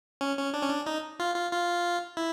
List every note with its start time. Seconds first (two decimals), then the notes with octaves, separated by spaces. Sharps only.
0.21 C#4
0.38 C#4
0.54 D4
0.62 C#4
0.70 D4
0.86 D#4
1.20 F4
1.35 F4
1.52 F4
2.17 E4